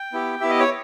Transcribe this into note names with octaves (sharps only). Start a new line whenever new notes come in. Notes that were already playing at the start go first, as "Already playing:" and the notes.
Already playing: G5
B3 E4 G4
B3 E4 G4 E5
D#5
C#5